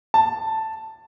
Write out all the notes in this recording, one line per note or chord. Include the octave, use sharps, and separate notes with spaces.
A5